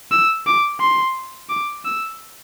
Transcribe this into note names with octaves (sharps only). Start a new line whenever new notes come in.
E6
D6
C6
D6
E6